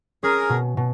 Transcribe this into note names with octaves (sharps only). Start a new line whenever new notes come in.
C#4 G#4 A#4
B2
B2